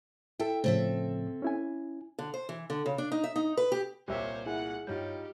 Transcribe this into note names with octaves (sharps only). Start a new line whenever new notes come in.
E4 A4 E5 G5
A2 C#3 F3 C4 A4 E5
C#4 E4 G#5
D3
C5
E3
D3
C#3
D4
D#4
E5
D#4
B4
G4
C2 A#2 G4 C5 C#5 E5 D6
E4 G#4 F#5 G#5
G2 G3 D#4 F4 G4 C#5 G6